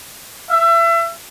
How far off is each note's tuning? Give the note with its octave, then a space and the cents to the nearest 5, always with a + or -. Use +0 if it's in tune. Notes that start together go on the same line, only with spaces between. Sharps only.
E5 +30